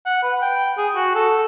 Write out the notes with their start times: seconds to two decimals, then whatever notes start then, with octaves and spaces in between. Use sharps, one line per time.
0.06 F#5
0.23 B4
0.42 G5
0.78 G#4
0.96 F#4
1.15 A4